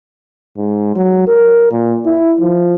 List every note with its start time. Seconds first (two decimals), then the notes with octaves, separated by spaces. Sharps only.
0.58 G#2
0.96 F#3
1.27 A#4
1.72 A#2
2.06 E4
2.41 F3